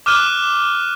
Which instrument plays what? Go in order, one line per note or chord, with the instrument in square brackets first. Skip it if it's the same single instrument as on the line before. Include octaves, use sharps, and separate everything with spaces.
[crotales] D6 F6 F#6 D#7 E7 G7